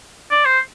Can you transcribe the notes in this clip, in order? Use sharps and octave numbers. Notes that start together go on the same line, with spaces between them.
D5
C5